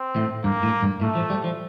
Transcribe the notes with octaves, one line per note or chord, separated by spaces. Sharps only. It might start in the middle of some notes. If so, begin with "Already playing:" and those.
Already playing: C4
A2
G2 A#3
A2
G2
A2 A3
F3
G3
F3